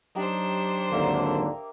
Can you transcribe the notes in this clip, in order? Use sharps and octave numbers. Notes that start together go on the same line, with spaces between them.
F#3 D4 D#4 G4 C5 G5
G#1 D#2 D3 A#3 E5 A#5